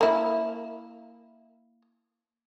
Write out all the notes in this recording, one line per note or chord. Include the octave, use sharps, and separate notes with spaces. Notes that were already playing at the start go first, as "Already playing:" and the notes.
A#3 E4